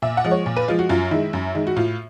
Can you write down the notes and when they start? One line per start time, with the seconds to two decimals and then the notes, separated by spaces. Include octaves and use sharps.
0.02 A#2 E5
0.17 F#5
0.24 F3 G#3
0.31 C#5
0.46 A#2
0.57 B4
0.68 F3 G#3 F4
0.79 F#4
0.89 F#2 F4
1.11 D#3 G#3 E4
1.33 F#2
1.55 D#3 G#3
1.67 F#4
1.77 A2 F4